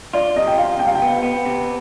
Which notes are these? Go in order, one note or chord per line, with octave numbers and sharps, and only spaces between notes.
F4 D5
C3 D#5
G5
F4 F5
C3 G5
F5
G5
B3
B3
C3